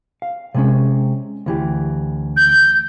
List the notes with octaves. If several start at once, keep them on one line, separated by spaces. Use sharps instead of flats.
F5
C3 G#3 C#4
D2 E3 G4
G6